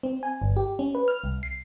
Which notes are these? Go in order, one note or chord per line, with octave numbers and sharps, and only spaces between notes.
C4
G#5
G1
G4
C#4
B4
F6
C2
C7